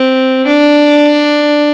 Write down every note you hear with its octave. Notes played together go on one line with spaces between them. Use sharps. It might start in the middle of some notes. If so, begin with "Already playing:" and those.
Already playing: C4
D4